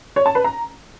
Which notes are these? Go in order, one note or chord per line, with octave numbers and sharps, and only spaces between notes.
C#5
A5
B4
A#5